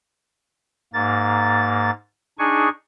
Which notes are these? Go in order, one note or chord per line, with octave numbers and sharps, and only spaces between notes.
G#2 A#3 A6
D4 D#4 G#4 G#5 C#6